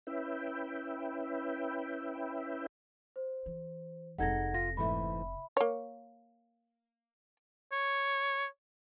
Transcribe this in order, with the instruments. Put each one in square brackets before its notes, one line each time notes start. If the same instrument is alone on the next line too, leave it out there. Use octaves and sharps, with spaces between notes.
[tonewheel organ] C#4 E4 B4 E5 G5
[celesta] C5
[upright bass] E3
[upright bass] F1 C3 [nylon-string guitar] G#3 D#4 A4 [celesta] F#5 G#6 A#6
[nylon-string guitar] F4 [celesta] A#6
[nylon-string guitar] G#2 E3 A3 [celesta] E5 B5
[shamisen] A#3 C#5
[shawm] C#5